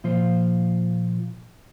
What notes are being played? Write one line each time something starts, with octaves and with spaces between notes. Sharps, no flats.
A#2 F3 F4 C5